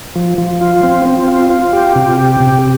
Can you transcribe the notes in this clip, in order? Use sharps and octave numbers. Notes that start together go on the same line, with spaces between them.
F3
F3
F4
C4
C4
F4
F4
G4
C3
G4
C3